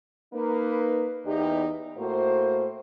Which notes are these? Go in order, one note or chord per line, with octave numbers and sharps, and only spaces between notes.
A#3 D#4 B4
E2 D#4 G4
A2 A#3 F#4 C5